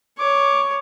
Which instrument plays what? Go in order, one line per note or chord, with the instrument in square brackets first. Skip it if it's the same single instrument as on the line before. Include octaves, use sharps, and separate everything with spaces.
[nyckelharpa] C#5 [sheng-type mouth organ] D6